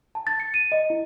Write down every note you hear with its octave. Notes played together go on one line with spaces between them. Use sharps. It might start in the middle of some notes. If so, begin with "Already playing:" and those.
A5
A6
C#7
D#7
D#5
E4